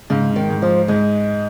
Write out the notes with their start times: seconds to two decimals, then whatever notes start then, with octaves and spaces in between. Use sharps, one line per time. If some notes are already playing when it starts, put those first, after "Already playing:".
0.10 G#2 C#3
0.36 D#3
0.50 G#2
0.62 F3
0.88 G#2 G#3